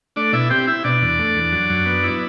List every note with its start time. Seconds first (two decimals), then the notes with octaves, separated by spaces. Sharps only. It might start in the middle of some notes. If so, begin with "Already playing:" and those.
0.16 A3 D4 D5
0.33 B2 E4 E5
0.50 C4 G4 G5
0.67 E4 E5
0.84 B2 D4 D5
1.02 E2
1.19 A3
1.36 E2
1.52 F#3
1.70 F#2
1.86 B3
2.03 E4